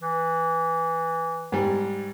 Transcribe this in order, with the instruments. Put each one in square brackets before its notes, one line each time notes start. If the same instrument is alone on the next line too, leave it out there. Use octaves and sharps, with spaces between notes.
[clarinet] E3
[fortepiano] G#2 G3